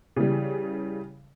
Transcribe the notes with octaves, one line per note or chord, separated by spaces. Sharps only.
C#3 E3 G3